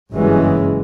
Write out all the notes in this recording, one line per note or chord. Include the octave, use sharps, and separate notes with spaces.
F#1 G2 E3 F#3 G#3 C#4